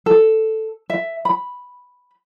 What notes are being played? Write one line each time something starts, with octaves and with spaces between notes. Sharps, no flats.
A4
E5
B5